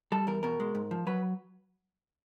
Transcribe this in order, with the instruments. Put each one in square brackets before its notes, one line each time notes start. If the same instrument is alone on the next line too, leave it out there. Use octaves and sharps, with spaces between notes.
[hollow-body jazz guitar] G3 A4
E2 A#4
B2 A#4
G#3
G#2
F3
F#3 B4